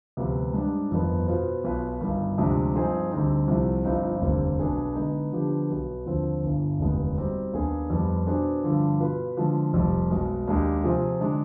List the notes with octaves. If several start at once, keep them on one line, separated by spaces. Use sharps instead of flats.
D2 C3 F3 B3 F4
G#2 G3 D4
G1 F2 D#3 B3
B2 B3 F4 C5
B1 B2 B3 F4 B4
G1 G2 D#3
D2 C3 F3 G#3 D4
G2 F3 C4 D#4 G#4
D2 D3 G3 C4 D#4
C2 C3 F3 C4
G1 G2 F3 C4 D#4
F1 D#2 D3 G3 C4
B1 B2 B3 D4 G#4
D3 G#3 B3 D#4
D3 F3 B3 D4 G4
B1 B2 B3
D#2 D3 F3 C4
G1 G2 D3
F1 D#2 D3 G#3 B3
B2 G3 C4 D#4
D#2 D#3 B3 D4 G#4
F2 D#3 G3 B3
B2 B3 D4 G#4 C5
G2 D3 F3
B2 B3 F4 B4
D3 F3 G#3
F1 F2 C3 G3
B1 B2 G#3
D#2 D#3 G#3 D4 G4
C3 F3 C4 F4 G#4
D3 G#3 D4